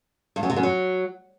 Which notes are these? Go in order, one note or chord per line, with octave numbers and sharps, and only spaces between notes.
G2
F#2
C3
F#2
F#3